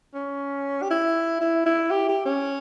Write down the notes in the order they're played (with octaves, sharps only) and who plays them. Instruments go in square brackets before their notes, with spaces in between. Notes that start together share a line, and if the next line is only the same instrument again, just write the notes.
[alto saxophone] C#4
G4
E4
E4
E4
G4
G4
C#4